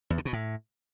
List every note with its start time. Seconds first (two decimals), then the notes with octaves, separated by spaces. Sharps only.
0.10 E2
0.18 D3
0.25 B2
0.33 A2